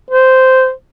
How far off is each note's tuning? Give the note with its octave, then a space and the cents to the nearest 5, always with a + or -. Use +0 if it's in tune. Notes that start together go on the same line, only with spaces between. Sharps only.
C5 -10